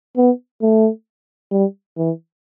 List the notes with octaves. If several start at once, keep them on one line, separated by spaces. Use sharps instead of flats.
B3
A3
G3
E3